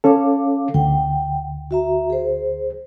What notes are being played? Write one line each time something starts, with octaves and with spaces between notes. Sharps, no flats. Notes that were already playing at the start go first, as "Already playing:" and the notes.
C#4 A4 F5 D6
D2 F#5 G5
F#4 E5 A#5
G#4 C5